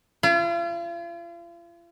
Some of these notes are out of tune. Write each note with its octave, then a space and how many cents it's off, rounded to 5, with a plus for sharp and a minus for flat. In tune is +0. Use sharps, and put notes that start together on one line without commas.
F4 -40